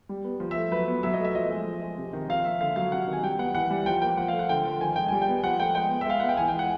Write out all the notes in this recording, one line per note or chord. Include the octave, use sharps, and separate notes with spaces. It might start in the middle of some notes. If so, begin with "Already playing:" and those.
G3
B3
F3
E5
A3
F#3 B4
B3
F#3 E5
D#5
A3 E5
F3 D#5
G#3
F3
G#3
C3
D#3
F3 F5
A#3 E5
D3 F5
F#3 F5
C3 F#5
D#3
G#5
G3 G5
B3 F#5
E3 F#5
G3
F3 G5
A#3 G5
F3 F#5
F5
A3
F#5
D3 G5
F3
D#3 G#5
G#3 G5
G3 G#5
G5
B3
F3 F#5
A3 G5
G#3 G5
B3
E5
G#3 F5
B3 F#5
G5
E3 G#5
G5
G#3
F#5